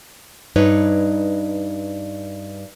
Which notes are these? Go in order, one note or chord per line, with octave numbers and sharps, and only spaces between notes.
G2 D#4 B4 C#5